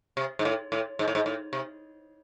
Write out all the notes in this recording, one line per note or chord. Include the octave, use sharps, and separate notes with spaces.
C3
G#2
A2
A2
G#2
A2
G#2
A2
C3